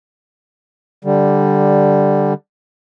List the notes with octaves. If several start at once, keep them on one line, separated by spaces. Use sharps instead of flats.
D3 G3